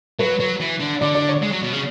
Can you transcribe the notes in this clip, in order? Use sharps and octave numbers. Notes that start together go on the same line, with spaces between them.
F#3 B4
F#3
E3
D3
D3 D5
D5
C#5
G#3
F#3
B2
C#3